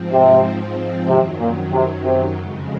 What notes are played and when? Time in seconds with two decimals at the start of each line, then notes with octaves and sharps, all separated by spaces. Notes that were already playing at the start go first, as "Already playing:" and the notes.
Already playing: G#2 F3 C4
0.12 C3
1.07 F#2 C3 D#3 F#3
1.39 A#2
1.72 C3
2.04 C3
2.36 F2 C#3 G#3